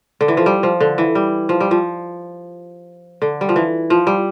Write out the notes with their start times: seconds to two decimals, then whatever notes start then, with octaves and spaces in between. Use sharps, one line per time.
0.21 D3
0.28 E3
0.37 F3
0.46 G3
0.63 F3
0.80 D3
0.98 E3
1.15 G3
1.49 F3
1.61 G3
1.71 F3
3.22 D3
3.41 G3
3.49 F3
3.56 E3
3.90 F3
4.07 G3